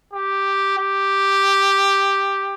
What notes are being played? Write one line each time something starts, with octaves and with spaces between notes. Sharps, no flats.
G4
G4